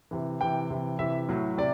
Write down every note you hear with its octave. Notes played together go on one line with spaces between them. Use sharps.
C3 E3
C3 E3 G5
C3 E3
C3 E3 E5
A2 F#3
C3 D5